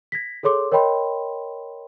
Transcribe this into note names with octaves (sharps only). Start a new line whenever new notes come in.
G#6 A#6 B6
G#4 A4 C#5 C6 D6
A#4 C#5 D#5 G5 B5 C6